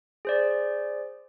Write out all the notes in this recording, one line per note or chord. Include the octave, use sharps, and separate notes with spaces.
G#4 C5 D5